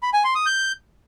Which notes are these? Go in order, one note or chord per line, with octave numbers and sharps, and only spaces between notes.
B5
G#5
C6
D#6
G6